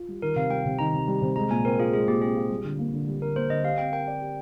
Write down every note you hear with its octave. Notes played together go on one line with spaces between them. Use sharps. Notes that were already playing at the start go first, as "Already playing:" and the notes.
Already playing: F4
G3
D#3 A#4
C3 F5
G3 G5
C3
D#3 A#5
C3
G3
C3
G#3 A#5
A#2 G#5
C4 A#4
F4 G#4
G#3 G#4
A#2 G4
C4 G#4
F4
G3
D3
A#3
D3
G3
D3 A#4
A#3 C5
D3 D#5
G4 F5
C4 G5
A#4 G5
D5
G4